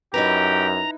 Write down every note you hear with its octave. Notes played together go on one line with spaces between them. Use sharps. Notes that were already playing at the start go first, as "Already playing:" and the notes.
F#2 D#4 E4 G4 B4 A#5